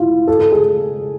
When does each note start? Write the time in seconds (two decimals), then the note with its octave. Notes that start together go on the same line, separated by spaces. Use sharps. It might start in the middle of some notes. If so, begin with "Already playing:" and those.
Already playing: E4 F4
0.27 A4
0.40 A4
0.52 G#4